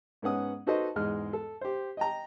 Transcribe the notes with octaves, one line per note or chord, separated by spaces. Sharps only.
G#2 B3 C#4 F#5 D#6
D#4 F#4 A4 B4 C5 D#5
E2 G#2 G#3 D#5 F6
A4
G4 C5
D#5 G5 A#5